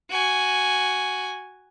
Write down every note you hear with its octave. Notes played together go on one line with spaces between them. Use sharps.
F#4 G#5